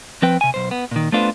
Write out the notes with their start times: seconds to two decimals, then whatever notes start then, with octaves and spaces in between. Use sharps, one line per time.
0.22 F3 C4 B4 G5
0.41 C3 G#5
0.54 B1 C5
0.71 B3
0.91 A#2 D#3
1.12 A3 B3 D4 F4 B4 C5